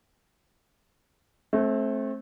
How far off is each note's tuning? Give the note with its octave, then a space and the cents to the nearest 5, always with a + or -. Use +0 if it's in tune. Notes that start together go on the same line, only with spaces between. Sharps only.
A3 -20 C4 +25